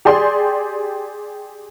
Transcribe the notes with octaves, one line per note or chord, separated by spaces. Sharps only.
G4 G#4 D5 C6